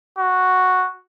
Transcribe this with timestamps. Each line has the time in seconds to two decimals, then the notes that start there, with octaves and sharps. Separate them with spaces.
0.18 F#4